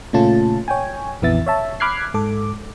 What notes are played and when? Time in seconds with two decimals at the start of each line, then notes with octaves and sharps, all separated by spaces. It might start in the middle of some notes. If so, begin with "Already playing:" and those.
0.13 A#2 C#3 A3 C#4 F4 A5
0.68 C#5 G5 G#5
1.22 A#1 F2 E3 B3 E5 A6
1.47 C#5 E5 A5
1.80 B5 D6 F6 F#6 G#6 C7
2.14 G#2 A4 D6